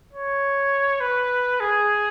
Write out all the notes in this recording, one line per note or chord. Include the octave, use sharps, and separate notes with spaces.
C#5
B4
G#4